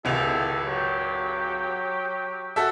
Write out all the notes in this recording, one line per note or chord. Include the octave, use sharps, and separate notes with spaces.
G#1 C#2 E4 G4 A4 F7
F#3 G4
F#4 A4 E5